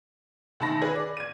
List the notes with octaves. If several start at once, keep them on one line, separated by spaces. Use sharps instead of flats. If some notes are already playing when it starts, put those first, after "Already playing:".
D2 D#3 A5 B5 A#6
G#4 B4
D5
G#6 D#7